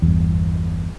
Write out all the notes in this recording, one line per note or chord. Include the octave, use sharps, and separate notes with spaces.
G1 E2